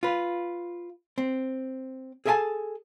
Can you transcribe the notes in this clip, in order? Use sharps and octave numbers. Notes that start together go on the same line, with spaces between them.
F4 B4
C4
G#4 A4 D#5 E5 G#5 A5